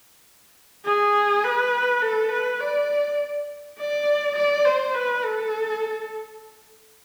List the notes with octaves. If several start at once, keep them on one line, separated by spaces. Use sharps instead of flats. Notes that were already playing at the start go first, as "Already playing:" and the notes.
G#4
B4
A4
B4
D5
D5
D5
C5
B4
A4